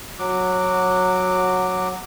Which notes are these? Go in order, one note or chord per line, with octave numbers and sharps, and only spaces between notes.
F#3 F#4 D6